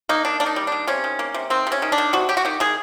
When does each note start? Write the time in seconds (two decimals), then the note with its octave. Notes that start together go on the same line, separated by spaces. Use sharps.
0.09 A#3 D#4
0.25 D#3 D4
0.40 A#3 D4
0.46 D#4
0.56 G3
0.67 D#3 D4
0.88 C3 C#4
1.04 D#3
1.19 A#3
1.34 C3
1.50 D#3 C4
1.67 C3
1.72 C#4
1.82 D#3
1.92 D4
1.98 D#3
2.13 C3 F#4
2.29 F#3 G4
2.37 F#4
2.45 D#3 G4
2.60 D#3 G#4